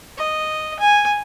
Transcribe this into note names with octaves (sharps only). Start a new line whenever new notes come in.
D#5
G#5